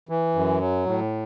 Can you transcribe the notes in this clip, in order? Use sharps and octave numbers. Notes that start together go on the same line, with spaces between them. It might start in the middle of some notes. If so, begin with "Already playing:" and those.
E3
F#2
F#3
A2